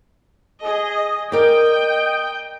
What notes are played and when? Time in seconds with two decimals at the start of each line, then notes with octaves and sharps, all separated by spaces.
0.62 G#4 D#5
1.32 A#4 D5 D#5 G5